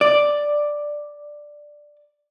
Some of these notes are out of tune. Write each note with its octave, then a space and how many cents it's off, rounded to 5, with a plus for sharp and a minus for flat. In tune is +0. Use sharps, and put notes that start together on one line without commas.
D5 +5